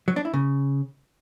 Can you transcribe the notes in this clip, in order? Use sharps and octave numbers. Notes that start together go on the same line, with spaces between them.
F#3
D4
E4
C#3